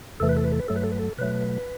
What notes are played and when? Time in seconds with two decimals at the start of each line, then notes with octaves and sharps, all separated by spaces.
0.20 E2 C3 E3 A3 A4
0.29 B4
0.36 A4
0.44 B4
0.52 A4
0.59 B4
0.68 G2 F#3 A3 A4
0.76 B4
0.84 A4
0.92 B4
0.99 A4
1.18 B2 F#3 A3 B4